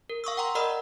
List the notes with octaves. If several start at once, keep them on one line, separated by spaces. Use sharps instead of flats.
A#4
F5 C#6 D#6 E6
F#5 G5 A#5 C6
A#4 D5 D#5 B5 E6 F6